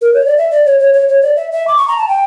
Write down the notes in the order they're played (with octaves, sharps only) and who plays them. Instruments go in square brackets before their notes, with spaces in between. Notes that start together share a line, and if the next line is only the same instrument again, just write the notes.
[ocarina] A#4
C#5
D5
E5
D5
C#5
C#5
C#5
C#5
D5
E5
E5
D6
C#6
A#5
A5
G5